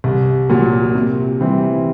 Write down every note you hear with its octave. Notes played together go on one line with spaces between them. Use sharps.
C2
A#2 F#3
C3
E3 G3 C4 E4